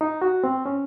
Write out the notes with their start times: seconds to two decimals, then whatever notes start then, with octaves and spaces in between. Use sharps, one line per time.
0.01 D#4
0.22 F#4
0.44 C4
0.66 C#4